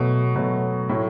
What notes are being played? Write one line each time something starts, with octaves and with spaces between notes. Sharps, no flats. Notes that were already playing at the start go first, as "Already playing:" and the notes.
Already playing: B2 F#3 A3
B2 F#3 A3
A2 F#3 A3